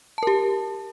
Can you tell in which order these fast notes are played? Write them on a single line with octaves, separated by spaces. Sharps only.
A5 A#4 G4